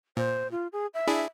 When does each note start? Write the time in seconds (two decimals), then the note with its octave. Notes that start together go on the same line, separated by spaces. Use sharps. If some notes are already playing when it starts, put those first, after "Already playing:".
0.17 A#2 C5
0.51 F4
0.73 G#4
0.94 E5
1.07 D4 E4 G#4